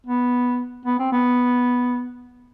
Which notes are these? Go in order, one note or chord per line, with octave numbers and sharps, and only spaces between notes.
B3
B3
C4
B3